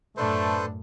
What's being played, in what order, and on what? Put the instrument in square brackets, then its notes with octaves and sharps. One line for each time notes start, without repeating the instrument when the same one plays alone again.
[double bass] F#2 A2 [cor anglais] A3 [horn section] B3 D4 [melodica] A4 B4 C5